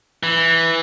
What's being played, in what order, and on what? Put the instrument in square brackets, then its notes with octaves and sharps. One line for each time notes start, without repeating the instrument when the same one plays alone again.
[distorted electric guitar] E3